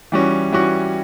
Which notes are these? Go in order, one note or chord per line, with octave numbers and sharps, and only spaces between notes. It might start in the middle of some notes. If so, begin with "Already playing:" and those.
E3 G3 C#4 F#4
E3 G3 C#4 F#4